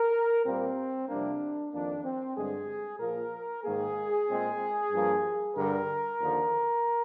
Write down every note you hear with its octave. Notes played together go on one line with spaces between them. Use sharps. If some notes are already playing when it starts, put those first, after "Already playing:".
Already playing: A#4
A#2 G3 A#3 C4
F2 C3 G3 A#3 D4
F2 D#3 A#3 D4
C4
G2 D3 G#3 G#4
A#2 F3 A#3 A#4
G#2 D#3 A#3 G#4
A#2 G#3 C4
G2 F3 A#3
G2 D3 G3 A#4
D#2 D3 F3